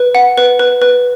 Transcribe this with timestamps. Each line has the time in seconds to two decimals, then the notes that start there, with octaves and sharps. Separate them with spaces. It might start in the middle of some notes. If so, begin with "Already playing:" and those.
Already playing: B4
0.15 F#5
0.37 B4
0.59 B4
0.82 B4